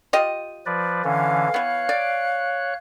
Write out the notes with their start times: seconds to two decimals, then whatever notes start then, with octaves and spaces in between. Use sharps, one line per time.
0.13 F4 G4 D#5
0.66 F3 B4 D5
1.04 D3 E3 C#4 F5
1.54 E3 B3 C#5 F#6
1.89 D5